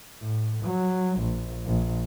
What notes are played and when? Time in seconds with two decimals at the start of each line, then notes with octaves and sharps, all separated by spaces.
0.21 A2
0.64 F#3
1.19 A#1
1.65 A#1